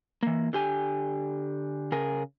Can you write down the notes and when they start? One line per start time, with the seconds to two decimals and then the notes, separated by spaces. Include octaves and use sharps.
0.23 E3 A#3
0.53 D3 G4 G#5
1.92 C#3 G#4 A#4